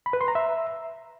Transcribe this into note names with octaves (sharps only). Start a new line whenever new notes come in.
B5
B4
C6
A#5
E5